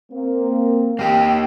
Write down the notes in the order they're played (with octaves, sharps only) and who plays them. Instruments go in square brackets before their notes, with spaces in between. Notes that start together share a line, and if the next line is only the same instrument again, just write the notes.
[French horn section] A#3 C4
[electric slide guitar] A#3 G4 [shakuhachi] G5